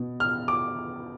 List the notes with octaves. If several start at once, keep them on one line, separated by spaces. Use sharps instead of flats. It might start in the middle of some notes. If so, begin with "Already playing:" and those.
Already playing: B2
F6
D6